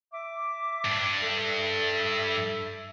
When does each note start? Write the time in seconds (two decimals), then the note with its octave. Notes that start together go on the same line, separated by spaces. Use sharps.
0.12 E5 D6
0.85 G2 D4
1.21 A4 E5